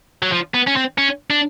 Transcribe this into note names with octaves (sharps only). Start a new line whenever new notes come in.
F#3
F3
B3
C#4
C4
C#4
D4